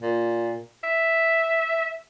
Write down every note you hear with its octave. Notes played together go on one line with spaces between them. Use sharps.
A#2
E5